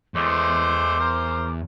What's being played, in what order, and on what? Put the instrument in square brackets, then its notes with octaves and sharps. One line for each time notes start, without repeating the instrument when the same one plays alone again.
[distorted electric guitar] E2 [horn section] G#3 A3 C5 [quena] D6
[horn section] A#4 C5